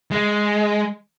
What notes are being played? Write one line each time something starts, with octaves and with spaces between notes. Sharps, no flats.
G#3